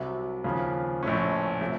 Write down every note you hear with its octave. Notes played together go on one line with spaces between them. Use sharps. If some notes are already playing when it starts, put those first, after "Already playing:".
Already playing: C2 C3 F#3
D#2 C#3 F3
A#1 A2 A3 C#4
C3 F3 A3